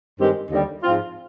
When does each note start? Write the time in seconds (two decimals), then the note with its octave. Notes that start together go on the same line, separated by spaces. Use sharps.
0.19 G2 D#3 G#3 C4 G4
0.50 D#2 D3 G3
0.83 G#2 F3 C4 F4